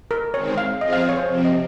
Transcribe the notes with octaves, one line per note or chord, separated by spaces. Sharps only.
A#4
D#3 G#3 C4 C#5
F5
F3 C4 F4 G#4 D#5
F5
C#5
C5
C3 F3 C4 C#5
D#5